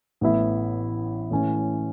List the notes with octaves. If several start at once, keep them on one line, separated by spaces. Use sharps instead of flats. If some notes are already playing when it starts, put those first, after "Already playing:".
A1 A2 E3 B3 E4
A2 E3 C#4